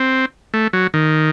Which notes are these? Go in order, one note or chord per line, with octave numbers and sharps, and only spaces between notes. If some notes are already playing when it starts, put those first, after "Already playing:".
Already playing: C4
A3
F#3
D#3